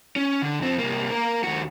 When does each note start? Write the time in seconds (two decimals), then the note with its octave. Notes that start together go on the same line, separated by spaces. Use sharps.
0.16 C#4
0.42 D3
0.60 F2 C4
0.79 C2 A#3
1.11 A#3 A#4
1.43 D#2 F#4